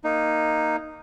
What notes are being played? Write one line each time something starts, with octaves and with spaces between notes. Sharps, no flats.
A#3 D#4